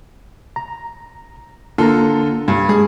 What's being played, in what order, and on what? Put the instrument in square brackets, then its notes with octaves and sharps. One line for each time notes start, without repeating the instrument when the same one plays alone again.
[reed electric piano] A#5
[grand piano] D3 F4 A4 [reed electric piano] A#3 A#5
[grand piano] G2
[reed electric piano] G#3 [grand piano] G#4